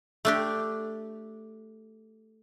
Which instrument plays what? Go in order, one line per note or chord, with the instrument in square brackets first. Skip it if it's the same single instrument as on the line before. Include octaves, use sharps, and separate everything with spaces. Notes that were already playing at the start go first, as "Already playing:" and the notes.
[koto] A3 D4 G4